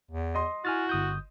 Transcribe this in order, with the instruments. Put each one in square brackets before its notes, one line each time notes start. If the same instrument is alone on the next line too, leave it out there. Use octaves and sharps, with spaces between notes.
[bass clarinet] E2
[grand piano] D#5 C6
[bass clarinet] E4 [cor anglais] F#4 [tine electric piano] G#5 F6 A6
[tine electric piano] G1 D#6 G6